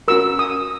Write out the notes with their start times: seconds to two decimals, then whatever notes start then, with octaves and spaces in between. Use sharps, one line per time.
0.08 C#4 F#4 A#4 E6
0.39 D#6